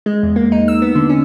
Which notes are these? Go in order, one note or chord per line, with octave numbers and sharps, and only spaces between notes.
G#3
E2
A#3
D#4
E6
B3
D3
C#4